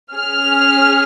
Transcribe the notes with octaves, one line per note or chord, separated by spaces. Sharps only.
C#4 G#4 F6